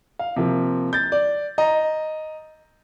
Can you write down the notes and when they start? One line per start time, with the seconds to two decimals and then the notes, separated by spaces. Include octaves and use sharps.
0.19 F5
0.36 C3 F3 A#3
0.93 G6 A6
1.12 D5
1.58 D#5 A#5